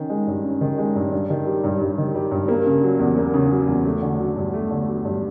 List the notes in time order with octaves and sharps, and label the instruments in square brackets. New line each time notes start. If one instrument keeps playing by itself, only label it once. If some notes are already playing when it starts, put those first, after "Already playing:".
Already playing: [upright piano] D#3 C#4
G#3
G2
C#4
D#3
G#3
G2
G2
D#3
G3
G2
G2
D#3
G3
G2
A#3
C#3
F#3
E2
A#3
C#3
F#3
E2
A3
D3
F#3
G2
A3
D3
F#3
G2